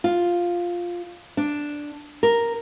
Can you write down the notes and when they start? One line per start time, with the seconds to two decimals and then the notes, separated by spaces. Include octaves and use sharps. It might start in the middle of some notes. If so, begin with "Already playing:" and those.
0.04 F4
1.37 D4
2.23 A#4